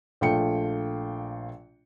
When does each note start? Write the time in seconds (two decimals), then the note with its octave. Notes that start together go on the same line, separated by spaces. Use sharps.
0.21 A#1 A3 F4 G5 C#7